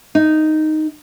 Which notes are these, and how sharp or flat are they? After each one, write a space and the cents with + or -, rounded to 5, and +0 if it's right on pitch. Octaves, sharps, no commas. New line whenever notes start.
D#4 -5